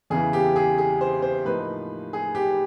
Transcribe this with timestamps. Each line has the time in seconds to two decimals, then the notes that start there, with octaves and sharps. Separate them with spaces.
0.10 E2 C#3 E3 G#4
0.33 G4
0.56 G#4
0.78 G#4
1.01 C5
1.22 C5
1.45 A2 F3 A#3 D#4 B4
2.13 G#4
2.35 G4